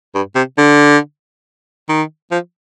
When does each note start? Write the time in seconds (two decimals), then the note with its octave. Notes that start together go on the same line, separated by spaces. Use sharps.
0.15 G2
0.35 C3
0.58 D3
1.89 D#3
2.31 F3